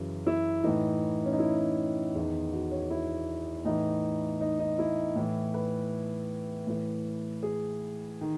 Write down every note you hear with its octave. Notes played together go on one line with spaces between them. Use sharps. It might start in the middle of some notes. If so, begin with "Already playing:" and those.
Already playing: F#2 C#3 E3 F#4
E4
A2 E3 D#4
C#4
D#4
E4
D#4
E2 D#3
F#4
C#5
E4
A2 E3 D#4
D#4
D#4
E4
A2 E3
B4
A2 E3
G#4
D#3